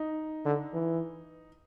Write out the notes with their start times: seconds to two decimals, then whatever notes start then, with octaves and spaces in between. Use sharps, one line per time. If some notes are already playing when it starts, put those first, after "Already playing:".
Already playing: D#4
0.45 D3
0.74 E3